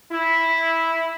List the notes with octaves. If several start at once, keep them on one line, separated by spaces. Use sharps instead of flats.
E4